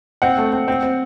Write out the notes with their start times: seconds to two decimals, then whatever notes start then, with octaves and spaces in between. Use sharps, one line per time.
0.22 C4 F#5
0.38 A3
0.53 C4
0.68 C4
0.83 C4